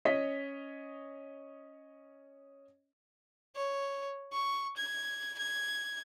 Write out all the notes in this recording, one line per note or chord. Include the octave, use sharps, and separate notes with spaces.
C#4 C#5 D#5 D#6 B6
C#5
C#6
G#6
G#6